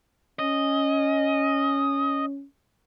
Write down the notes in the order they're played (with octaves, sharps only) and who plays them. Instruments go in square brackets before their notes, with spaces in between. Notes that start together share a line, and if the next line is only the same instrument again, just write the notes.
[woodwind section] C#4 [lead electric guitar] D#5